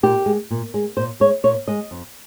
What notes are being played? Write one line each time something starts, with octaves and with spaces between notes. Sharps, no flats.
A#2 G4
G#3
A#2
G#3
A#2 C5
G#3 C#5
A#2 C#5
G#3 D#5
F2